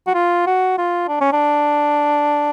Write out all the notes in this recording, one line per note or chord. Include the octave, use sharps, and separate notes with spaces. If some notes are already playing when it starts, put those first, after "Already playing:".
F#4
F4
F#4
F4
D4
C#4
D4